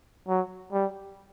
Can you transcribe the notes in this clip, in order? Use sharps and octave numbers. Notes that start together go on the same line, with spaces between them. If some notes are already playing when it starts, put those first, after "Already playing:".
F#3
G3